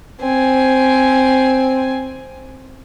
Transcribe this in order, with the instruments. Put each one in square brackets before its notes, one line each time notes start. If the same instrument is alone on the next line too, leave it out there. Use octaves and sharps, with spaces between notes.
[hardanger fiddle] C4 G#5